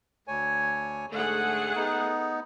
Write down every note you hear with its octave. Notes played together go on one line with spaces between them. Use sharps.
D2 C#5 G#5
G#2 D3 A3 G#4 F#5
B3 D#4